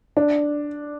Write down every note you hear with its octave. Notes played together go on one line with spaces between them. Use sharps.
D4